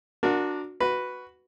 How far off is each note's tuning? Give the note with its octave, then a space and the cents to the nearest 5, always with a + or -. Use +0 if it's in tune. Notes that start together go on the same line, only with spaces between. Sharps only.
D4 +5 F#4 -25 A#4 +0
F#4 +0 B4 +0